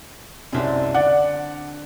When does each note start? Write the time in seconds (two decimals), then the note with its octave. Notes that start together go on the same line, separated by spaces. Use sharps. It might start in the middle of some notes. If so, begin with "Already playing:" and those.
0.53 C2 F#2 G#3 C4 D4
0.94 D3 D5 F#5